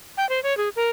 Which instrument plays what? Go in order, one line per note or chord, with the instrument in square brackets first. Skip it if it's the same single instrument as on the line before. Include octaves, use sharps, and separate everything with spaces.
[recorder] G5
C5
C#5
G#4
A#4